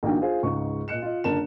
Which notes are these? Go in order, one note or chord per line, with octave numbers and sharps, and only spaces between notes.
A#1 D#3 A#3 D4 F#4 G5
F4 G#4 C5 F5
C#2 G#2 C#6
A#2 D#5 F#6 C#7 E7
F4 D#5
F#1 D3 A#4 A5 E7